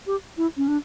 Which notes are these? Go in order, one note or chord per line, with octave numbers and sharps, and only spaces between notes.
G4
E4
C#4
D4